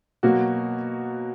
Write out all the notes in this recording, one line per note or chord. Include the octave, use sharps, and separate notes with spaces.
B2 F#3 A#3 F#4